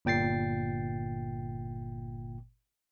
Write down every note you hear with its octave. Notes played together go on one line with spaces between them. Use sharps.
G1 A#2 G5 A6 C7